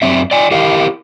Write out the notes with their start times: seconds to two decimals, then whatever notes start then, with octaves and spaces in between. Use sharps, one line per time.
0.02 F#2 C4 E5
0.31 D5 G5 G#5
0.51 E4 G4 A#4 F5